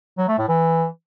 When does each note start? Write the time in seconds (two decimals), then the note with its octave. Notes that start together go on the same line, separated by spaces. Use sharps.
0.18 F#3
0.28 A3
0.38 A2
0.48 E3